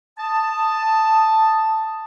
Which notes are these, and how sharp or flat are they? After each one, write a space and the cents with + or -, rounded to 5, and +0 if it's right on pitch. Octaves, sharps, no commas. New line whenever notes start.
A5 +5 D#6 -5